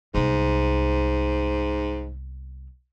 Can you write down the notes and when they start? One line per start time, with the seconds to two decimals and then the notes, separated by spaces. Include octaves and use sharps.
0.14 C2 G#2 B3